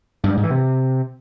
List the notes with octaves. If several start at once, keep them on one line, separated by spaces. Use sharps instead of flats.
G2
G3
G#2
E3
C3